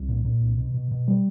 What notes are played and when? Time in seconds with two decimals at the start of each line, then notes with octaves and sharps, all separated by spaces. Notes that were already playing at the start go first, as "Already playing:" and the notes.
Already playing: C2
0.08 A#2
0.25 A#2
0.41 C2
0.57 B2
0.74 B2
0.91 B2
1.08 G3